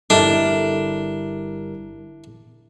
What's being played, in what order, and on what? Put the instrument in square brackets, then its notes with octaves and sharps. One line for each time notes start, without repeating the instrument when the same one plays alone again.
[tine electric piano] G1 G3 A#4 [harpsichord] D4 [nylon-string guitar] E4 [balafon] A4 D#5